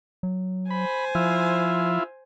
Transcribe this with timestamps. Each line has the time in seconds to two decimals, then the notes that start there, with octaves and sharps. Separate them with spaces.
0.23 F#3
0.71 C5 G#5 B5
1.15 F3 E4 F4